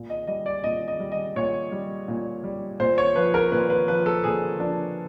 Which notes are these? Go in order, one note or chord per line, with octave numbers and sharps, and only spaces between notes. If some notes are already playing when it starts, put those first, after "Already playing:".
Already playing: A#2
D#5
G3 D#5
D5
A#2 D#5
D#5
G3
D#5
A#2 C#5
G3
A#2
G3
A#2 C5
C#5
F3 B4
A#4
A#2 B4
B4
F3 B4
A4
A#2 G#4
F3 D4